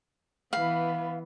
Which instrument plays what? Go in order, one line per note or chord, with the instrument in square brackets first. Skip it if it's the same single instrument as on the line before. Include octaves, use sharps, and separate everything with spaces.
[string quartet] E3 B3 [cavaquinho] F5 B5